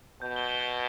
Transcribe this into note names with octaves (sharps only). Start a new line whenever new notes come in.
B2 G6
G7
G7
G7